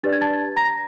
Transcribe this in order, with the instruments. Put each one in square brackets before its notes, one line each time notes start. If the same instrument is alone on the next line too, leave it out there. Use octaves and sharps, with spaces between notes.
[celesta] D4 G4 B4 D5 A6
G#6
A5 A6
A#5 A#6